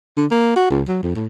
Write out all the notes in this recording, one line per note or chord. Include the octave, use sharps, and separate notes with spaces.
D3
A#3
F#4
C#2
F#3
F2
A2